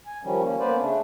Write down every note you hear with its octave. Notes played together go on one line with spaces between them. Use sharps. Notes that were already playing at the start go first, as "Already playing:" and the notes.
G#5
D#3 F3 G3 C#4
A#3 C#4
A#3 B3 C#4 B4 C5 D5
C#3 A3 D4